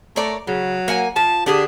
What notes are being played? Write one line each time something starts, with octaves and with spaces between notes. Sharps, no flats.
A3 A#4 C#5 D5
C#3 F#3
A#3 F#5 G#5
F3 A5
D3 D4 G4 G#4